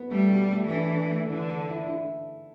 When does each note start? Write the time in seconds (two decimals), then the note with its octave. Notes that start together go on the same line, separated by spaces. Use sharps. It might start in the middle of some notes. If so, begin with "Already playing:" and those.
Already playing: B3
0.11 G3 A3
0.30 B2
0.51 A3
0.70 E3 D4
0.90 D4
1.10 A3
1.30 D3 E3
1.49 A4
1.69 E4
1.88 E4